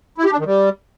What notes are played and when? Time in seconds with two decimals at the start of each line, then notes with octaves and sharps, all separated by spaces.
0.18 E4
0.25 G4
0.32 D4
0.39 D#3
0.46 G3